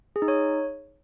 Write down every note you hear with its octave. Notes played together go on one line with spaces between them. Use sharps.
G#4
D#4
C#5